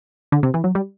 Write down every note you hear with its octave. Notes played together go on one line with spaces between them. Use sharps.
D3
C3
E3
F#3
G3